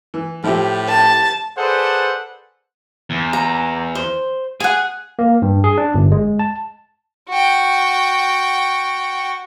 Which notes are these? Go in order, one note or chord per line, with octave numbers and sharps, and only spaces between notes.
E3
A2 F3 E4 G4
A5
G#4 A4 B4 C5 D5 F#5
E2
A#5
C5
G#4 F#5 G#5
A#3
G2
G#4
D4
G1
G#3
A5
F#4 G5